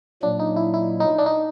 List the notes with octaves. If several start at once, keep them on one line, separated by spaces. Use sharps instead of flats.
A#2 F#3 A#3 D4
D#4
E4
E4
D#4
D4
D#4